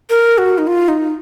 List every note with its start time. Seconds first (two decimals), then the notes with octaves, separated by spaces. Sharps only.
0.10 A#4
0.38 F#4
0.58 D#4
0.67 F4
0.88 D#4